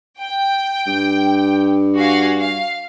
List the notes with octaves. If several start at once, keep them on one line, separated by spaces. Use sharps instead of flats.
G5
G2
F#4 F5 G#5
F5